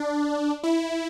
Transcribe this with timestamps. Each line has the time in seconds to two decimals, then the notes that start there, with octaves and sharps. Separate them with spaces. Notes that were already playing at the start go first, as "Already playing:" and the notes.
Already playing: D4
0.63 E4